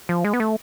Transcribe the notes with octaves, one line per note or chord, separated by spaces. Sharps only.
F3
G#3
B3
A3